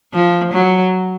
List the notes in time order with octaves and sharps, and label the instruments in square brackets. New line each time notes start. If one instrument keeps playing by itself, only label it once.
[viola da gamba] F3
F#3